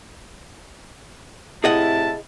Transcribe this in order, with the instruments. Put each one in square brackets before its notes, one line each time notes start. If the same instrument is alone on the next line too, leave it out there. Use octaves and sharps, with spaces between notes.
[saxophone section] A2 C3 E4 [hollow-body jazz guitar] G#4 D#5 F#5 [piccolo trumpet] A5